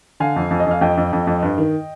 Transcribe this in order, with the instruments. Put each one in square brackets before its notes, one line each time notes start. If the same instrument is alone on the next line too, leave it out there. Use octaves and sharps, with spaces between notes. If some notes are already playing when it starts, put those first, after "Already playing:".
[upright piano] D3 F5 G#5
F2
F2
D#5
F2
F5
F2 D#5 G5
F2
F2
F2
G2
D#3